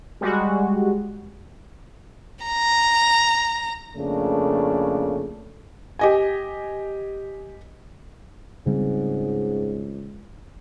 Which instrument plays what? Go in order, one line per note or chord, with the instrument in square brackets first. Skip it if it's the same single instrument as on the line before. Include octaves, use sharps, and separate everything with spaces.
[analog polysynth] G3 G#3 F#4
[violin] A#5
[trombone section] F2 C#3 A3 A#3 D4
[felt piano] G4 D#5 G#5
[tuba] C#2 [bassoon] G#2 [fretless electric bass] C#3 G3 C4